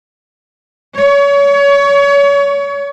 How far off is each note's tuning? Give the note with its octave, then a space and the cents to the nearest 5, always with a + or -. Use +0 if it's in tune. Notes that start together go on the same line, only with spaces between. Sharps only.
C#5 +30